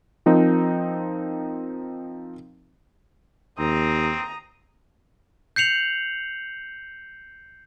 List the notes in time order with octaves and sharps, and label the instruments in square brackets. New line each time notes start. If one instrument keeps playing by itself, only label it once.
[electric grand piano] F3 C4 D#4 A#4
[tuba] D#2 [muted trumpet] C4 [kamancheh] A#5 D#6
[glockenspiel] G6 C7 C#7 F7 F#7